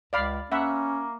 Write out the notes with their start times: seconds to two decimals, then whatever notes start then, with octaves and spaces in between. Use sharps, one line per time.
0.13 C#2 D5 F5 B5
0.52 A#3 C#4 E5 F#5 B5